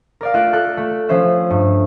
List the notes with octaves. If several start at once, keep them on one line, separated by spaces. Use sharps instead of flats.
A#4 D5 F5
A3 F4 E5 F#6 D7
A4 F#6
A3
F3 C#4 C5 E5
G2